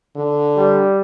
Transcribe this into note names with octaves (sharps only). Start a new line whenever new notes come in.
D3
G3